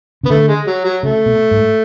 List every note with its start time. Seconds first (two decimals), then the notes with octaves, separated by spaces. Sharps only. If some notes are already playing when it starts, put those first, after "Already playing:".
0.23 C#3 B3
0.30 D3 A3
0.48 G#3
0.67 F#3
0.85 F#3
1.03 C#3 A3
1.26 B2
1.51 G#2